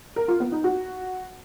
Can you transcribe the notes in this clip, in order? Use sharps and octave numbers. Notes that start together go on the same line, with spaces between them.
A#4
F4
B3
D#4
F#4